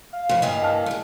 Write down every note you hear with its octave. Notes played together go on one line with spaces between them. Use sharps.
F5
F2 A2
G2 E3 A#3 D#5
F5 A5 F6
G#3 A3